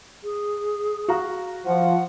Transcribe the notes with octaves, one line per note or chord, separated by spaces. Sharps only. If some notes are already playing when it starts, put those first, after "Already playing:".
G#4
F#4 F5 A#5
F3 F#5